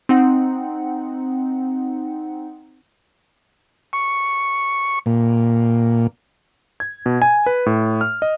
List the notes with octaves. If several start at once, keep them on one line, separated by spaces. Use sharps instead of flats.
C4 D#4 F#5
C#6
A#2
G#6
B2
G#5
B4
A2
F6
D#5